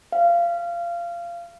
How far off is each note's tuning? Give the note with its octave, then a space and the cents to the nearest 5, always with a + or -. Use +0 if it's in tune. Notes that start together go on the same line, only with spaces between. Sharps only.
F5 -20